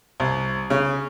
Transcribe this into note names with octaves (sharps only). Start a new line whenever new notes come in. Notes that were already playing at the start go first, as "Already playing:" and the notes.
C2
C#3